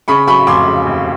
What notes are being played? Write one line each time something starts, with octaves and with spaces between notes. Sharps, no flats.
C#3 B5 C#6
F#3 B5 C#6
F1 C6 D6
C#3
D#2